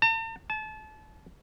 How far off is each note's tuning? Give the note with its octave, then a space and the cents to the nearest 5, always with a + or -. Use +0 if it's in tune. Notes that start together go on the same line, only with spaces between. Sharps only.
A5 +45
A5 -30